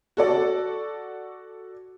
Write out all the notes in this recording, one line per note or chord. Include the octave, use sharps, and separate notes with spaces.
F#4 A4 D5